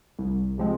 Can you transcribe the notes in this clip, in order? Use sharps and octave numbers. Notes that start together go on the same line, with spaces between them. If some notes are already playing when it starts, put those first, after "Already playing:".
C2
C3 F3 G#3 C4